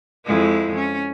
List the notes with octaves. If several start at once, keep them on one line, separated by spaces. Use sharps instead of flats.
F2 G#3 E4
C#4